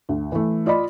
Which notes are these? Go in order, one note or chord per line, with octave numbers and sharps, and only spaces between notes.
D2
E3 A3
F4 D5 D#5 B5